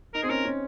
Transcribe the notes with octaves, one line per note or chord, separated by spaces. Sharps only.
D#4 A#4
C4 G#4
C#4 A#4
C#4